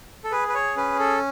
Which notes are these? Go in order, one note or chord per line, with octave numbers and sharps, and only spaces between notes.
A4
G#4 B4
B4
C#5
C#4 B4
A4